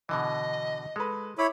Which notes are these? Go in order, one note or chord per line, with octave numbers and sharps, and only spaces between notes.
B2 D3 E3 D#5
G#3 A4 B4
E4 C#5 B5 D6